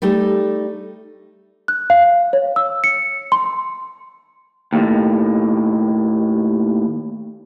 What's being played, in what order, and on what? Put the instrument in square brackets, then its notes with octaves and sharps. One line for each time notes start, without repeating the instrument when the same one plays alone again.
[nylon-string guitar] G3 A3 D#4 G4 A4
[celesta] F#6
F5
C#5
E6
C#7
C6
[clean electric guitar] D#2 A2